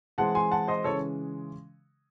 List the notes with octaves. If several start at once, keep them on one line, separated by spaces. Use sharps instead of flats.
E3 G#3 C4 F#5 A5
G#5 C6
F#5 A5
C5 D#5
C#3 E3 G#3 C#4 A4 C#5